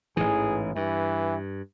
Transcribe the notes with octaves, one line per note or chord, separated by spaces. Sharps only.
A1 G#2 E3 G#4
G2 E3